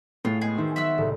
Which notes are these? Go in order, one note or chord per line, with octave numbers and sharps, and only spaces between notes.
A2 F4 G#4
G#3 B3 C4 G#4
D#3 F#4 C5 E5
F#3 E5 F#5 E6
C2 A2 C#3